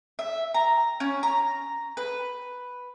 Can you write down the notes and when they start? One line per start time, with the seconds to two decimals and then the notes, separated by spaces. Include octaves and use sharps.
0.19 E5
0.54 A#5
1.00 C#4
1.23 A#5
1.97 B4